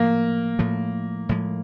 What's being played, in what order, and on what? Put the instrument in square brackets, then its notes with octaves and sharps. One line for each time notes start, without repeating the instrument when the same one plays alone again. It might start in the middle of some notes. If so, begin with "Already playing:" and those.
Already playing: [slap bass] A2 F3 A3 [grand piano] A#3
[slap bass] A2 F3 A3
A2 F3 G#3